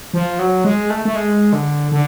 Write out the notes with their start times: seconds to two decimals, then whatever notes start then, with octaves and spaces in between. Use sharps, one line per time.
0.13 F3
0.39 F#3
0.64 G#3
0.90 A3
1.05 A3
1.16 G#3
1.53 D3
1.92 D3